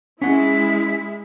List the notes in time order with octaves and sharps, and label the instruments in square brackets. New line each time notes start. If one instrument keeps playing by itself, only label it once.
[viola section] G#3 E4 [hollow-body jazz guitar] C#4 F#5 [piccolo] B6